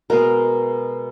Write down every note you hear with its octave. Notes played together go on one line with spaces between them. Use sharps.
B2 G#3 B3 A#4